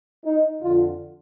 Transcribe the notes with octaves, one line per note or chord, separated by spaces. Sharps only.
D#4
F2 D3 F4